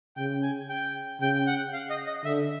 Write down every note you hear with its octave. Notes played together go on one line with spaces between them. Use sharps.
C#3 G5
G#5
G5
C#3 G5
F#5
F5
D#5
D#5
D3 E5